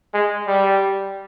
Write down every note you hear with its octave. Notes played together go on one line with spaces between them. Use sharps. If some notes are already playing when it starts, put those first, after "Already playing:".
G#3
G3